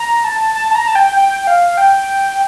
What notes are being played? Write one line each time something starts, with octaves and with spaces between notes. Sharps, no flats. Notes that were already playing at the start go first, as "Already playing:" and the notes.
Already playing: A#5
A5
A5
A5
A#5
A5
G5
G5
F5
G5